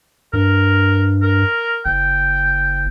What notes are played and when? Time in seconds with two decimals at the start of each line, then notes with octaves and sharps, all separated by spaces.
0.33 G2 A#4
1.23 A#4
1.86 F#1 G5